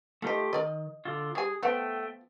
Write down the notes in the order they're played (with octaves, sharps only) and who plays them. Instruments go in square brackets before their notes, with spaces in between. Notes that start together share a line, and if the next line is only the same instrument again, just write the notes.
[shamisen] D#3 D#5 [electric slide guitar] A3 F4 G4
[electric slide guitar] D#3 [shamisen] A#4 D5 D#5
[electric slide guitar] D3 F4
[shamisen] G3 G#5 [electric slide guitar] G#4
[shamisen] F3 B3 F#5 [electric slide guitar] A3 G5